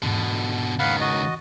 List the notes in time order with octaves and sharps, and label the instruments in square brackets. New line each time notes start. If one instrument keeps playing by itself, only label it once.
[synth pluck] E2 G#2 [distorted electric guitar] B2 D3
[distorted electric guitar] C#2 D#3 [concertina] F5 F#5 B5
[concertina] F#4 D#5 [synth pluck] A6